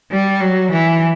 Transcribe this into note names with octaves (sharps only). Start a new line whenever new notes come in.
G3
F#3
E3